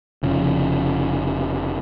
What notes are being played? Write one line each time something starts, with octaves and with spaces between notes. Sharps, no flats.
F1 C#3 F3